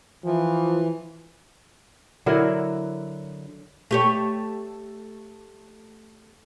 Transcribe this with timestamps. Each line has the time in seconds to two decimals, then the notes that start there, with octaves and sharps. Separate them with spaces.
0.24 E3 F3
2.26 D3 F#3 E4 A#4
3.91 A3 G4 C#5